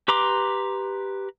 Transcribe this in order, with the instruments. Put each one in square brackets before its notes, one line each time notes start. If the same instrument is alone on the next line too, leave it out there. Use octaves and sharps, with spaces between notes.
[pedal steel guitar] G4 B4 A#5 C6 D6